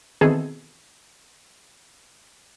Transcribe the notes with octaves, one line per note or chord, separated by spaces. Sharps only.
B2 D#3 E3 C4 G#4 A4